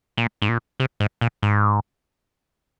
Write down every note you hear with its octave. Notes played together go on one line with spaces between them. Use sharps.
A#2
G#2
A#2
C3
G#2
A#2
G#2